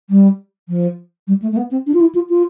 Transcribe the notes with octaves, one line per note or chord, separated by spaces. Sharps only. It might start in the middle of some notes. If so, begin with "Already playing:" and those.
G3
F3
G3
A3
A3
B3
C4
D4
F4
E4
F4
F4